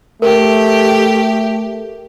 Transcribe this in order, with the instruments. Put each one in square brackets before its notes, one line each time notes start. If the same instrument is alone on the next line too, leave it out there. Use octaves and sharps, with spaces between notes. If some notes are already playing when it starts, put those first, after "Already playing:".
[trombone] A3 [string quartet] G4 [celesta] A#4